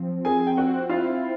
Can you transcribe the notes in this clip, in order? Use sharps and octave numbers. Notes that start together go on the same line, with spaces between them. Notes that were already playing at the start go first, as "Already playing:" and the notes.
Already playing: F3 C4
C4 G#4 G#5
G5
C4 F#4 F#5
E4 F4 F5